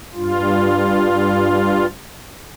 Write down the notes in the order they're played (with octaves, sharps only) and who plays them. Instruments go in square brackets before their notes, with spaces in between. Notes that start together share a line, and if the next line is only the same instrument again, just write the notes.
[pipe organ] G2 F4